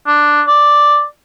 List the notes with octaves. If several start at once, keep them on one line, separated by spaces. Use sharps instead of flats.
D4
D5